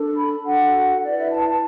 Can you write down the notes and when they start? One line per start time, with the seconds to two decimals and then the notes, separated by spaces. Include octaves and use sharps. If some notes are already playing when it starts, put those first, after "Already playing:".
Already playing: D4 A4
0.16 B5
0.45 D4 F#4 A4 F#5
1.03 E4 B4 D5
1.18 E5
1.32 A5